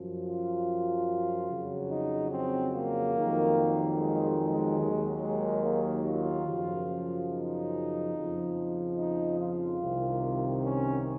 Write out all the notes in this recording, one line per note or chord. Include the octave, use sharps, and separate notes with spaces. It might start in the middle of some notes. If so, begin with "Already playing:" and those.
Already playing: F#2 F3
F4
F2 C#3 F#3
D#4
C4
A#3
F2 D#3 F#3
G#3
G#3
D#2 D#3 F#3
G#3
A#3
F4
F#2 C#3 F3
D#4
F2 C#3 F3
D#4
F4
C2 C3 D#3
C#4